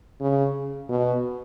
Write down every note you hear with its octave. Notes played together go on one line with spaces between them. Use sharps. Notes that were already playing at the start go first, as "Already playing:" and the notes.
C#3
B2